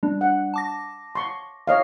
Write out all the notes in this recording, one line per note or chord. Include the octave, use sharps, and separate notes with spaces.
G3 D4
F#5
A5 D6 A#6
C6 C#6
C#5 D#5 F5